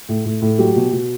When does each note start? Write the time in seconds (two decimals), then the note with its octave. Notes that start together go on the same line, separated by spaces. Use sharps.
0.09 A2
0.25 A2
0.42 A2
0.58 F#3 G4
0.76 B2
0.92 B2